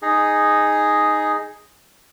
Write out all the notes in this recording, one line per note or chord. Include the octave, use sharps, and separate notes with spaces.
D#4 G#4